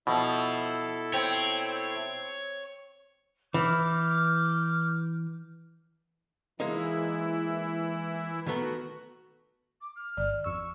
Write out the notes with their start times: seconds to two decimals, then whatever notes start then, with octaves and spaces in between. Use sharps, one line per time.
0.07 B2 F3 E4 A4
1.14 C4 C#5
3.54 E3 D6 F6 G6
6.60 E3 G#3 A#3 D#4 E4
8.46 D#3 A3 B3 F#4
9.81 D6
9.96 F6
10.17 G#1 D5
10.44 F2 C#6 E6